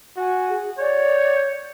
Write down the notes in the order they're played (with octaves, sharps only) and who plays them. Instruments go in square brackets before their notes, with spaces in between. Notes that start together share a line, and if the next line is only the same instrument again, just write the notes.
[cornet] F#4 [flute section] G#5
[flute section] G#4
[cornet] C#5 [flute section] D5 F#5 G6